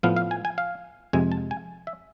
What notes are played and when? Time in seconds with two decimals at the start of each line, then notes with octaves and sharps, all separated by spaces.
0.03 A2 F3 B3 F5
0.16 F5
0.31 G#5
0.45 G#5
0.58 F5
1.13 F2 C3 G#3 G#5
1.32 A5
1.51 G#5
1.87 E5